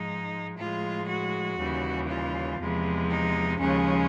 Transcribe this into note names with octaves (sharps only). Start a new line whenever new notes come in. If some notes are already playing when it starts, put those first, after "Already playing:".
Already playing: G#2 F3 G#3 D#4
A2 F3 G#3 F4
F#4
D#2 C#3 E3 G3
F4
E2 C3 F3 G#3
D#4
D#2 C#3 F3 G#3 C#4